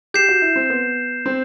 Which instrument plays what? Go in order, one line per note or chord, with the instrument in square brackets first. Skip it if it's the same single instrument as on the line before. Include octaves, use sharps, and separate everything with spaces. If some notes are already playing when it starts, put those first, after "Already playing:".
[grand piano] G4 [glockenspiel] G6 C7 E7
[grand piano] F#4
E4
C4
B3
C4